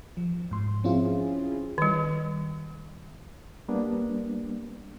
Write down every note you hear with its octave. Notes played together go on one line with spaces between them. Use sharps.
F3
G#2 C6
F3 C4 C#4 E4 F4 G#4
D#3 G3
G3 A#3 B3 D4